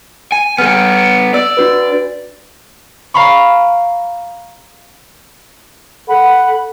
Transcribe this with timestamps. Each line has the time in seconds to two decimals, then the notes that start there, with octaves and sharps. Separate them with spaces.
0.32 G#5
0.58 B3 A4 F6
1.34 D5 E6
1.57 D4 F#4 B4
3.14 F5 A#5 B5 C#6
6.09 A4 F#5 B5